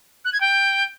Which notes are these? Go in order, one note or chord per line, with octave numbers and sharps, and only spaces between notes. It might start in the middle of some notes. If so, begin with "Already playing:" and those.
F#6
G#6
G5